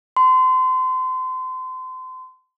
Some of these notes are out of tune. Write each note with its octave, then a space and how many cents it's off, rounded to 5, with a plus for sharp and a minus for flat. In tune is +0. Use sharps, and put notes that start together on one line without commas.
C6 -30